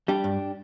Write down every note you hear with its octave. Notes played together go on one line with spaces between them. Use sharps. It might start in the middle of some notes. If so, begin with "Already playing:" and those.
G3 D4 G4
G2